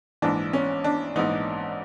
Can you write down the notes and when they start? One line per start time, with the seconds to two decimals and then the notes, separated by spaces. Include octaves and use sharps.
0.22 A#1 G#2 E3 D4
0.53 C#4
0.84 D4
1.16 A#1 G#2 E3 D#4